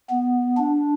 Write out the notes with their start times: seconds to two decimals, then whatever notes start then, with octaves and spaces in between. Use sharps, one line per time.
0.10 B3
0.57 D4